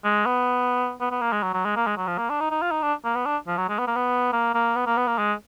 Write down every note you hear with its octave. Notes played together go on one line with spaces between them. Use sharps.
G#3
B3
B3
B3
A#3
G#3
F#3
F#3
G#3
A#3
G#3
F#3
F3
A#3
D4
D#4
D#4
F4
D#4
D4
A#3
B3
D4
F3
F#3
G#3
B3
A#3
B3
A#3
A#3
B3
A#3
B3
A#3
G#3